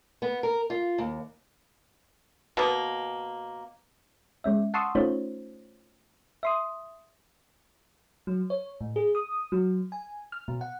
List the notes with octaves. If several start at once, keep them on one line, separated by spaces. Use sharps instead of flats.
B3
A#4
F4
D#2
B2 A#3
G#3 C#4 E5
F#5 A5 C6 C#6 D#6 E6
A3 C#4 D#4 F4 C5 C#5
E5 C6 D#6
F#3
C#5
A2
G#4
D#6
F#3
G#5
F6
B2
F#5